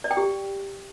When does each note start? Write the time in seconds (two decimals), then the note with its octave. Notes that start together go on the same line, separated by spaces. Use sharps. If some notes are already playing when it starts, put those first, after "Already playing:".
0.04 D5
0.11 G5
0.17 G4